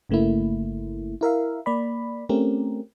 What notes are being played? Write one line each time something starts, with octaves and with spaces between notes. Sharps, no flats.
G1 C#3 A3 A#3 E4
E4 A#4 E5 F5
A#3 D5 B5
A3 C4 C#4 G4 A#4